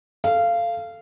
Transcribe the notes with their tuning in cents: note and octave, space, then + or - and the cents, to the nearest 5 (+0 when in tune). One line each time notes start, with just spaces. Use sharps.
A4 +0 F5 -20